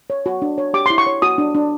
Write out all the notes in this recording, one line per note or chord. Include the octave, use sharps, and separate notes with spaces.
C#5
F#4
D4
C#5
G4 D6
E4 C6
C#6
C#5
F#4 D#6
D4
D4